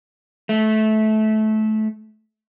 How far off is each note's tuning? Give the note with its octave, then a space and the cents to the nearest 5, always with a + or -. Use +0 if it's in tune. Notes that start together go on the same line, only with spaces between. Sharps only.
A3 -20